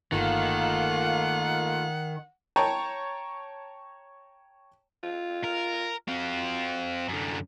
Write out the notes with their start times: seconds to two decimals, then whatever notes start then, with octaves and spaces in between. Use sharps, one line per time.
0.12 G1 D#3 A3 A#3 F4 F#5
2.56 C#5 G5 A5 A#5
5.03 F4
5.44 A#4
6.08 C4 F4 F#4
7.09 F#2 D3